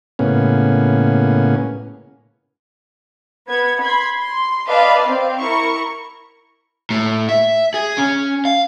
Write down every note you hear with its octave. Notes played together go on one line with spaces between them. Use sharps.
A2 C#3 A#3 B3 C#4
B3 G#6
B5 C6 G#6
C6
B4 D5 D#5 F5 A5
C4 F5
E4 A#4 C#6
A2
E5
G#4
C#4
F5